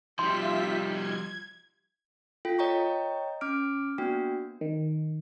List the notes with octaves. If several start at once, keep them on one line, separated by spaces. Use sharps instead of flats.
F3 G3 D#4 F4 G4 E5 C6 B6
G#6
F4 A4 G5 B6
C#5 D#5 G5 A#5 C#6
C#4 D6 F6 D7
A#3 B3 D4 F#4 G5
D#3